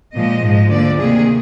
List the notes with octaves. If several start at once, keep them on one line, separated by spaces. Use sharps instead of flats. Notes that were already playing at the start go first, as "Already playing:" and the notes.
A#2 F3 G#3 D#5
G#2 F3 G#3
D2 D3 F3 A#3 D5
C3 D#3 A#3 G#4